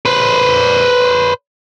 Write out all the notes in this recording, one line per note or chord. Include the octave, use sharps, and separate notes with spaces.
B4 C5